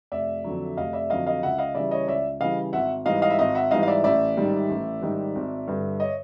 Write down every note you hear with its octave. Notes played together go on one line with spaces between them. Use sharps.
F1 D5 E5
F2 D3 F#3
F1 D#5 F5
D5 E5
F2 D3 F#3 D#5 F5
D#5 F5
C#2 E5 F#5
D#5 F5
C#3 E3 G3 D5 E5
C#5 D#5
C#2 D5 E5
C#3 E3 G3 D#5 F5
G#1 E5 F#5
G#2 E3 G3 D#5 F5
D#5 F5
E5
G#1 D#5 F5
E5 F#5
G#2 E3 G3 D#5 F5
F5
D5 E5
A1 D5 E5
G#2 D#3 G3
A1
G#2 D#3 G3
G#1
G2 D3
C#5 D#5